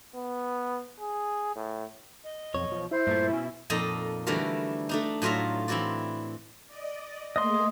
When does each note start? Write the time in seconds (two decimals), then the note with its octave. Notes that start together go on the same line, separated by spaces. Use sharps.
0.15 B3
1.00 G#4
1.56 A2
2.24 D#5
2.54 B1 F2 C#5
2.72 F3
2.91 E4 C5
3.07 G2 A#2 A3
3.31 B2 C#4
3.70 F2 A#2 D#4 A4 D#5
4.27 D3 E3 G3 A3 F#4 A#4
4.89 A3 D4 D#4
5.22 A2 F#3 F4 E5 A#5
5.68 E3 C4 E4 F#4 D5
6.67 D5 D#5
7.36 A3 A#3 G#4 D#5 C6